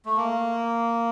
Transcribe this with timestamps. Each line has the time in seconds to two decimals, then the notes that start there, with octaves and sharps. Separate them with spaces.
0.05 A3
0.17 A#3